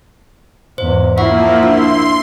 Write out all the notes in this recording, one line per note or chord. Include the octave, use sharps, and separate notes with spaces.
E2 G#2 C5
F3 A#3 E4 E5 F#5 C#6
D4 C6